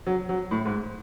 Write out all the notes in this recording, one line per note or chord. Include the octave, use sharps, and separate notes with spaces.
F#3
F#3
A2
G#2